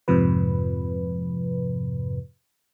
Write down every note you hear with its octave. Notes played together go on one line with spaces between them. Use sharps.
F2 G#2 C3 F3 B4